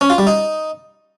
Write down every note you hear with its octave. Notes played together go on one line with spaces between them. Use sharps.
C#4
F4
G3
D#4